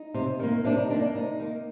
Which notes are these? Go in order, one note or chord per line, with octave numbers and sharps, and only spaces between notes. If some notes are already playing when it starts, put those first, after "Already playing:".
Already playing: D#4
C3
D#3 A#3
C3 D4
D#4
D#3 A#3 D4
D4
C3 D#4
D#3 A#3